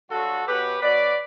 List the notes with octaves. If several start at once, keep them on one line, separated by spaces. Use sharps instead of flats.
G2 D3 F#3 F#4 A4
B2 F#3 G4 B4
B2 F#3 B4 D5